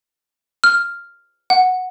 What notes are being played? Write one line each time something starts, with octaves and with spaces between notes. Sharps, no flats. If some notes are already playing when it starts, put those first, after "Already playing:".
F6
F#5